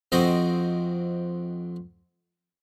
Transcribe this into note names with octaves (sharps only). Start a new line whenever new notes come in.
F2 C4 F#4 C5 D#5